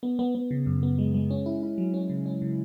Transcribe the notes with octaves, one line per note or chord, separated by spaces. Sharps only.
B3
B3
B3
C#3
F#2
B3
G#3
G#3
C#4
E4
E4
F#3
C#4
C#3
C#4
C#3